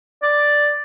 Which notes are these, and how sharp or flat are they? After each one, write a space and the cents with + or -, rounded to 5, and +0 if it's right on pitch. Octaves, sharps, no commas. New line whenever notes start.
D5 +0